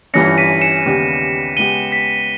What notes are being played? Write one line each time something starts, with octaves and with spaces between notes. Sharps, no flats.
G1 G2 E3 G3 C#4 A#6 C#7
B6 D#7
C#7 E7
D#2 C#3 G3 B3 G4
C#3 G#3 B3 G4 D#7 G7
B6